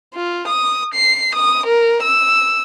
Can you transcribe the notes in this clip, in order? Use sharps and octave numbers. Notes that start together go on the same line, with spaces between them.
F4
D#6
C7
D#6
A#4
E6